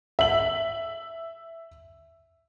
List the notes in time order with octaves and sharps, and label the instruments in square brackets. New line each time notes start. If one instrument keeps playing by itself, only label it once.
[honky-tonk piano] E5 F#7